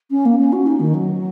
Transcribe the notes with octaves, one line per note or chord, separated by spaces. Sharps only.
C#4
A#3
C#4
F#4
D#4
D#3
F#3